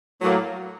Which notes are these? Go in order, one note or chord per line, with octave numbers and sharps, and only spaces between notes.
A2 F#3 A#3